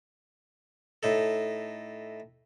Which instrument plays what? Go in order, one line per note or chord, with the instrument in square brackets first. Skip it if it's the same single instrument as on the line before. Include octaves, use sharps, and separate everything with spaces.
[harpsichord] A2 D#4 A4